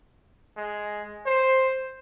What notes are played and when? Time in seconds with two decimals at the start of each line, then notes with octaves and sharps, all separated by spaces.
0.57 G#3
1.27 C5